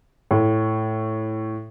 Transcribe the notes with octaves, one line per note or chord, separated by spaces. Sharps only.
A2